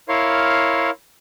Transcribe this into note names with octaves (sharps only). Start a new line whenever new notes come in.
E4 A#4 C#5 F5 C6